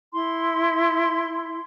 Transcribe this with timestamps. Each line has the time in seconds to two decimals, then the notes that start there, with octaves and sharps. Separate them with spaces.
0.13 E4 C6